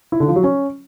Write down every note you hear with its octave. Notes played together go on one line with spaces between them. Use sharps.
E4
D3
F3
F#3
C#4